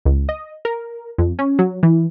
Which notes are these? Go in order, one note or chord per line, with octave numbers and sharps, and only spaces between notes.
C#2
D#5
A#4
F2
C#4
F#3
E3